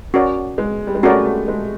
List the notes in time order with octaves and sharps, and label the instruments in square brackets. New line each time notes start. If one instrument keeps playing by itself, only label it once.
[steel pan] C#4 F#4 A#4 D5
[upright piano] G#3
G3
G#3
[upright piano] A3 [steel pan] C#4 F#4 A#4 D5
[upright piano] A3
G#3